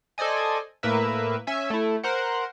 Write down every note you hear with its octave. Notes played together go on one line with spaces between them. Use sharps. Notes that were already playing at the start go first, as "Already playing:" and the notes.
A4 C5 D5 D#5 G#5
A2 A#3 A#4 B4 E5
C#4 E5 G#5
A3 E4
A#4 C5 F#5